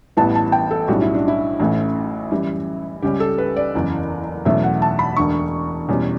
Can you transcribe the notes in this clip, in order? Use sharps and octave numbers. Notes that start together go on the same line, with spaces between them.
A1 A2 E3 G3 B3 A5
A5
G5
A4
B1 A2 G3 C#4 F#4
E4
D4
E4
A1 A2 E3 A3 C#4
F#2 E3 G3
C#2 C#3 G3 C#4 G4
A4
B4
D5
F#1 E2 C#3
E2 B2 F#3 A3 C#4 E5
F#5
A5
B5
E1 D2 D3 C#6
E2 B2 G3 C#4